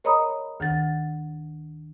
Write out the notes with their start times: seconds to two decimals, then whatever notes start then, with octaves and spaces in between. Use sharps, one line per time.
0.04 A#4 C#5 D#5 A#5 B5 D#6
0.60 D2 D#3 F#5 A6